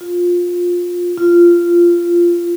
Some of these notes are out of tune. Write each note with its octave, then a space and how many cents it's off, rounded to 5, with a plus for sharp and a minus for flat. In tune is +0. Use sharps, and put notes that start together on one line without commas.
F4 +15
F4 -15